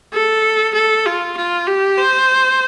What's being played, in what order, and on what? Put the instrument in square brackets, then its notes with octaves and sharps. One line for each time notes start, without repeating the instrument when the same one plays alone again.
[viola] A4
A4
F4
F4
G4
C5